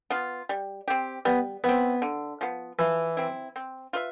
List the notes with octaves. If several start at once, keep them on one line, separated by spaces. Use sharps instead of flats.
B3 F4
G3
C4 G4
G3 B3
B3 C4 E4
D3
F3 B3
E3 F3
C4 E4
C4
F4 B4 E5